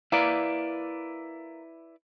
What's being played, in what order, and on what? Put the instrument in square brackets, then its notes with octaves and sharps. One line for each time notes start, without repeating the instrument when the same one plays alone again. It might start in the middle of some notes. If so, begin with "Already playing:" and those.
[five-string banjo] A#3 [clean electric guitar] E4 B4 D5